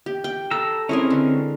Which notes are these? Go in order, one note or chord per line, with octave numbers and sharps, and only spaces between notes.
G4
G5
A4 A#5 E6
G#3 C4 C#4 E4 G#4 A#4
D3